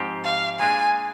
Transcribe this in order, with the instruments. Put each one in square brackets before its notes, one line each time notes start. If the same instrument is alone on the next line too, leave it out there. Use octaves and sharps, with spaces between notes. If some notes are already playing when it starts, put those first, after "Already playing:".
Already playing: [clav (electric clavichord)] G#2 F3 C4 G4
[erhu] F5
[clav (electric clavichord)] A#2 G#3 D4 G#4 [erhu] G#5